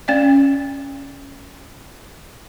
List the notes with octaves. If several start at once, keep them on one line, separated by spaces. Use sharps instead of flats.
C#4 D5 F5